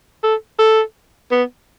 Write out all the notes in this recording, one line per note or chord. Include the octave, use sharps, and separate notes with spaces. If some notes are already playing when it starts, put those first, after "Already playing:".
A4
A4
B3